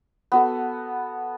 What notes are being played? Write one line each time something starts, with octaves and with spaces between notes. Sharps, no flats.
B3 F#4 A4